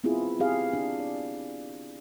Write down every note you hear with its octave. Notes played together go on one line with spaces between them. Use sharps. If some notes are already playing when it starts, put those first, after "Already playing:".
B3 C4 E4 F4 G#4
C4 G4 G#4 F5
D4
D5